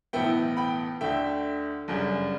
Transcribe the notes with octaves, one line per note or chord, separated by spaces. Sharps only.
B1 A2 E3 B3 E5 G5
G5 B5
D2 D3 A3 E5 G5
G1 F#2 C#3 G3